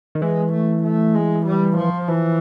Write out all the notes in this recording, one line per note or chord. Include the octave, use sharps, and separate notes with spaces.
D#3
E3 G#3
A3
A3
G#3
G3
F3
E3 F3